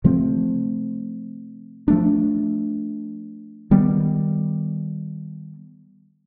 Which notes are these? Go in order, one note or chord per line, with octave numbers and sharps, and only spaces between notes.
C3 F3 A3 C4
F3 A3 D4
D#3 G3 B3